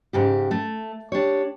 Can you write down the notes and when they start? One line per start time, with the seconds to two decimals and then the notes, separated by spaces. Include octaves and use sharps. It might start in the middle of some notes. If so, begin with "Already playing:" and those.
0.13 G#2 C#3 G4
0.51 A3
1.12 D4 G4 C#5